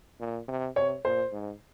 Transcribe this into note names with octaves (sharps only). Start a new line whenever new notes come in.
A#2
C3
C3 C#5
A#2 C5
G#2